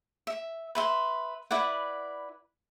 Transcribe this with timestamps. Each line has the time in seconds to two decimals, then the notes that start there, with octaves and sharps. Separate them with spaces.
0.27 E5
0.75 B4 E5 C6
1.51 E4 B4 D5 F#5